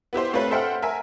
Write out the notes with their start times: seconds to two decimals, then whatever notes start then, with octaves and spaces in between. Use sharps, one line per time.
0.13 B3 E4 G4 C5
0.33 A3 C4 F4 A4 B4 C#5
0.50 A4 C5 E5 F#5 G5 F6
0.82 A#4 E5 G#5